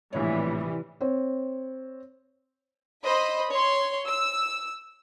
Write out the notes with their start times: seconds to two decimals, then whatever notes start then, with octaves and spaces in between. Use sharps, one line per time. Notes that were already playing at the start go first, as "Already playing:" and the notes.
0.13 A#1 A2 C3 E3 G3 C#5
1.01 C4 C#5
3.04 C5 D#5 B5
3.51 C#5 C6
4.07 E6